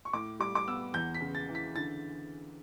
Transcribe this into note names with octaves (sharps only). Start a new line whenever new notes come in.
C#6
A2 D6
G3 D6
D6
B3 E6
E2 G6
B6
C#3
A6
E3
B6
D3 A6